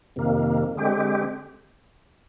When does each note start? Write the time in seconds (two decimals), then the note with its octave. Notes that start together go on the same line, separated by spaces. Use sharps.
0.16 F2 C3 D#3 A#3
0.76 D3 G#3 C4 G4